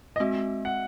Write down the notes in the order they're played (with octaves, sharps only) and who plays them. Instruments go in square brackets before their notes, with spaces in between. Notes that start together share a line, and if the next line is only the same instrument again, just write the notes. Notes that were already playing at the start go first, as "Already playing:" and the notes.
[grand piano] D#5
[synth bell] G#3 C4 F#4 [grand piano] E5
[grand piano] F#5